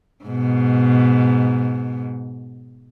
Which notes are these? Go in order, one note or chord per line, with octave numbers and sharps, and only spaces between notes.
G#2 B2